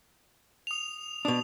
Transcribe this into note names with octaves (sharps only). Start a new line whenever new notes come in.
D#6 F7
B2 D4 D#6